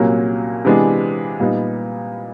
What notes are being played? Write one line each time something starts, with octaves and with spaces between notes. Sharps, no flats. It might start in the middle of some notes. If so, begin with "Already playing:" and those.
Already playing: C2 A#2 F#3 A#3 C#4
C3 E3 G#3 B3 D4
A#2 G3 B3 D#4